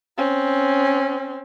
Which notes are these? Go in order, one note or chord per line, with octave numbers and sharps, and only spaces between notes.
C4 C#4